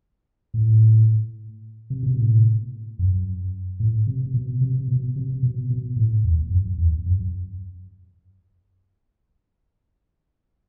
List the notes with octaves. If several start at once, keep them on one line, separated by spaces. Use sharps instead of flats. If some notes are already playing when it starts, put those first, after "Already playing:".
A2
C3
B2
A2
F#2
A2
C3
B2
C3
B2
C3
B2
B2
A2
E2
F#2
E2
F#2